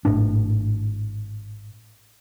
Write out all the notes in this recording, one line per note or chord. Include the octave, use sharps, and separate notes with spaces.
G#1 A2 D4